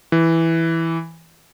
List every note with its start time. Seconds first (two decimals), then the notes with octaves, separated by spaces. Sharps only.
0.12 E3